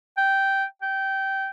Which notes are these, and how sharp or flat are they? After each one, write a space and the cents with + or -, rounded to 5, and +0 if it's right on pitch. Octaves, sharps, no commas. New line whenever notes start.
G5 -10
G5 -15